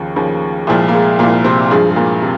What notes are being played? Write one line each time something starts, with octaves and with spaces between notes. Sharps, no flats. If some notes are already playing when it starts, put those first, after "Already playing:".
Already playing: D#2 C#3 F3
D#2 C#3 F3
C2 A#2 F3 G#3
A#3
G#3
C2 A#2 F3 A#3
C3 C4
G2 F3 G#3 G#4
G#3
A#2 A#3
C3